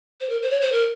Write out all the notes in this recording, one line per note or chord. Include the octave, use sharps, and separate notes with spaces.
C5
A#4
C5
C#5
C5
A#4